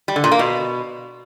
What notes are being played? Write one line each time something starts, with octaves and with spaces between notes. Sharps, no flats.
G3
D3
A#2
A#3
B2